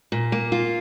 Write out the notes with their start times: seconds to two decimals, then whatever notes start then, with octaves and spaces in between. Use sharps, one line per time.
0.12 A#2
0.32 A#3
0.52 F4